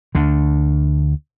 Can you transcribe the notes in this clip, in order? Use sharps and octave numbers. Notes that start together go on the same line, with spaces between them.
D2 D3